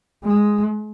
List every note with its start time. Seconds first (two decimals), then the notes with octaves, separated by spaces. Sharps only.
0.24 G#3